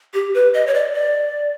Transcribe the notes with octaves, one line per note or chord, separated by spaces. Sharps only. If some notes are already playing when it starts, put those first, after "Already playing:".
G4
B4
D#5
C#5
D5
D5